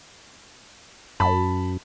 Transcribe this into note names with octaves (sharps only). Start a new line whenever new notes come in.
F#2 A5 B5